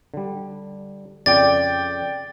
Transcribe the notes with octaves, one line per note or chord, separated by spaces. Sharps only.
D3 G3
F2 C#3 F4 D5 G5 A6